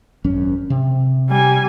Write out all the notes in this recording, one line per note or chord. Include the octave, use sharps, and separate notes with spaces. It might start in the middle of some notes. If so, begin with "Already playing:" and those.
G#1 F#2 C#4
C3
G3 G#5